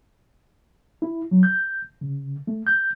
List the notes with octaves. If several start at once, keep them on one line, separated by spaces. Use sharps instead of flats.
E4
F#3
G6
C#3
A3
G6